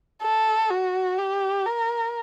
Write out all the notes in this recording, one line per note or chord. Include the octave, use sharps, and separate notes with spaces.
A4
F#4
G4
A#4